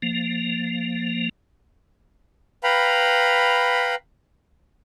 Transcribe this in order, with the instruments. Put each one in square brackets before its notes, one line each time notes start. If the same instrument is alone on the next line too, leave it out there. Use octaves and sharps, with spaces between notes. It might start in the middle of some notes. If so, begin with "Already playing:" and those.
[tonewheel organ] F3 A#3
[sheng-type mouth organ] B4 F5 G5 A#5 B5